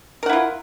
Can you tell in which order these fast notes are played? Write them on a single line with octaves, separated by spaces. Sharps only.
A#4 F#5 E4 F4